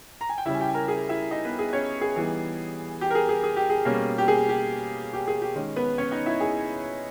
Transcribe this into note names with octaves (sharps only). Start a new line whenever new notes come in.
A#5
G#5
G5
C#3 G3 C#4 E4 E5
G#5
G4 G5
G#5
A#4 A#5
G#4 G#5
E4 E5
D#4 D#5
B3 B4
G#4
C#4 C#5
G#4
E3 G3 B3 D#4
G4
A#4
G#4
G#4
G#4
G4
G#4
B2 G3 A#3 C#4
G4
G#4
G4
G4
G#4
G4
D#3 G#3 C#4
B3 B4
C#4 C#5
D#4 D#5
E4 E5
G#4 G#5